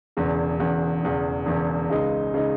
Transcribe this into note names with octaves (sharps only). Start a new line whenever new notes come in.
E1 E2 C#3
E1 E2 C#3
E1 E2 C#3
E1 E2 C#3
C#2 C#3 G#3 D#4
C#3 G#3 D#4